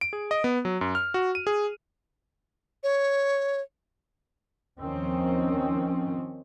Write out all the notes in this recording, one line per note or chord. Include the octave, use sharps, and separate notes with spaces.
D7
G#4
D#5
B3
F#3
F#2
F6
F#4
D#7
G#4
C#5
D#2 D#3 F3 C4 C#4